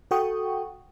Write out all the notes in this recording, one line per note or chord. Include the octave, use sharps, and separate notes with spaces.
F#4 A4 F#5 G5 C#6 D#6